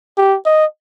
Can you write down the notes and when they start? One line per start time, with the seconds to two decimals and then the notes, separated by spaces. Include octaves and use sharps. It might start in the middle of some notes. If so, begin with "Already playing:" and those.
0.17 G4
0.45 D#5